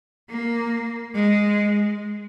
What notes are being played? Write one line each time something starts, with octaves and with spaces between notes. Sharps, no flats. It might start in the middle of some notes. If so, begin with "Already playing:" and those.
A#3
G#3